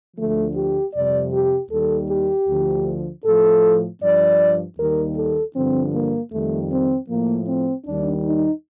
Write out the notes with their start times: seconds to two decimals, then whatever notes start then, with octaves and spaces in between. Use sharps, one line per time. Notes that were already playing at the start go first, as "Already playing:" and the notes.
0.17 D2 D3 F3 A3
0.55 G4
0.94 F2 C3 G3 D5
1.32 G4
1.70 D#2 D#3 G3 A4
2.10 G4
2.47 D2 D3 F3
3.24 A2 F3 A4
4.02 G2 F3 D5
4.78 D#2 D#3 G3 A#4
5.17 A4
5.55 G2 D3 F3 C4
5.93 A#3
6.32 F2 D#3 G3 A3
6.70 C4
7.08 A2 F3 A#3
7.47 C4
7.85 D#2 D#3 G3 D4
8.24 D#4